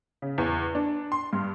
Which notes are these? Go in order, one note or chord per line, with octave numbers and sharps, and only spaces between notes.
C#3
E2
D4
C6
G2